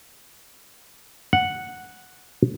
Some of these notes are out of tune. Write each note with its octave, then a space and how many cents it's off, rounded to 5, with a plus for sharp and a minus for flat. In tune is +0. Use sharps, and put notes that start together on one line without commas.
F#5 -5